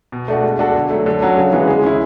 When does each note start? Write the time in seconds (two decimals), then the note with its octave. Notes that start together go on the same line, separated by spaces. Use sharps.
0.12 B2
0.28 A3 D4 F#4
0.43 G#3
0.59 D4 F#4 A4
0.75 D3
0.90 F#3 A3
1.06 D3
1.22 F#3 C#4 F#4
1.38 C#3
1.53 E3 G#3 B3
1.68 G#3
1.83 C#4 E4